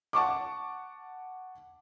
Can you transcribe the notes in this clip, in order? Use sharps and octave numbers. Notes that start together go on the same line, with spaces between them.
F#5 A5 C#6 D6